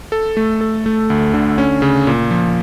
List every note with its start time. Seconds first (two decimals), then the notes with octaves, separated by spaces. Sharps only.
0.12 A4
0.37 A3
0.61 A4
0.86 A3
1.10 D2
1.34 D3
1.58 C#4
1.82 C#3
2.07 A#2
2.31 F3